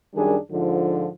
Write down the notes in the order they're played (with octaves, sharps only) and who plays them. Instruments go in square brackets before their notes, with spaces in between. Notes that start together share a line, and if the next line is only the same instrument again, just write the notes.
[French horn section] F#2 D#3 G3 D4 G#4
G#2 D3 F3